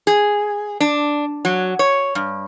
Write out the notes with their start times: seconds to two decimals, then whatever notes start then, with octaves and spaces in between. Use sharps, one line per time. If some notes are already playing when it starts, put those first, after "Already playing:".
0.07 G#4
0.80 D4
1.45 F#3
1.79 C#5
2.15 G2